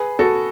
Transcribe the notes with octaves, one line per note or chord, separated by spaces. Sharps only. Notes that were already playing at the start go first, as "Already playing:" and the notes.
Already playing: G#4 B4
F#4 A4